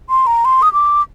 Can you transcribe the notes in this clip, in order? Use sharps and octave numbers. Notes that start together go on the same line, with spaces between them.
C6
A#5
C6
D#6
D6